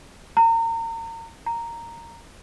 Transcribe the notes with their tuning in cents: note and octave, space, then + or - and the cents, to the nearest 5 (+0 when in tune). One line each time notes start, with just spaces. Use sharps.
A#5 -35
A#5 -5